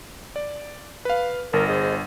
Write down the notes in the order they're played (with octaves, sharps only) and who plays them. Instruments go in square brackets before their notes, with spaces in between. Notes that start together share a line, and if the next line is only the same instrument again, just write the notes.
[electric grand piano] D5
B4 F5
[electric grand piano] G1 [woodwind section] A#4
[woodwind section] G#4 C5 D#5